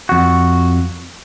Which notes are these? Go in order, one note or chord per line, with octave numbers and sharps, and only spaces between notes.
F2 F#4